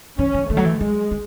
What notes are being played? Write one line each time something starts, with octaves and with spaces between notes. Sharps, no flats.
E3 C#4
E3
D#3 A3
F#3
E3
F#3 G#3
G#3